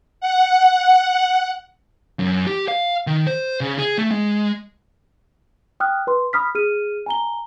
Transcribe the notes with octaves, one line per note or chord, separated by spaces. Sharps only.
F#5
F#2
G4
F5
D#3
C5
C#3
G#4
A3
G#3
G5 D#6 F6 F#6
B4 C6
B5 D#6 F6 B6
G#4 F6 D#7
G#5 A#5 G7